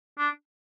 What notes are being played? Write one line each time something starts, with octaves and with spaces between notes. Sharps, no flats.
D4